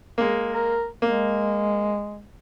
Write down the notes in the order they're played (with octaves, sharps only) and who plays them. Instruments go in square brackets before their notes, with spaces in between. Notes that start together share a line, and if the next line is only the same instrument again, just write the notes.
[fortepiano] G#3 A#3
[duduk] A#4
[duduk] G#3 [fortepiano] A#3